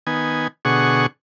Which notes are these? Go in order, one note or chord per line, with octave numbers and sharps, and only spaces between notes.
D#3 B3 G#5
B2 D3 G#4 F#5 C#6